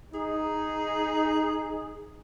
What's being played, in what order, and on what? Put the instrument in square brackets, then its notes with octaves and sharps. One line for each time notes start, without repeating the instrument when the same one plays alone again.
[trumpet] D#4 [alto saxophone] G#4